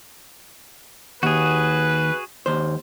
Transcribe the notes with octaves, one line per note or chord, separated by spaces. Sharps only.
D#2 F#4 G#4 B4
D#2 C5